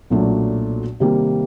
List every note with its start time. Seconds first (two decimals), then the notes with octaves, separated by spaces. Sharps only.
0.10 B1 A#2 F#3 A3 D4
1.00 C3 D#3 G3 A#3